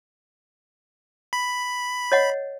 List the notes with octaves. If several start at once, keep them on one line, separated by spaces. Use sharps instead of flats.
B5
C#5 D#5 F#5